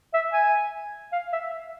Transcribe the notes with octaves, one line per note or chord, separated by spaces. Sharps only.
E5
G#5
F5
E5